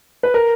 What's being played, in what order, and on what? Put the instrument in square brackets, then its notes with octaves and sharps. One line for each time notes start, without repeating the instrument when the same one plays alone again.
[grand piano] B4
A#4